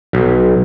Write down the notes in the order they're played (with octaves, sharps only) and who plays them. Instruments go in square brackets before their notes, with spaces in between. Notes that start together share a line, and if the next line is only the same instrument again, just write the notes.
[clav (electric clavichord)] B1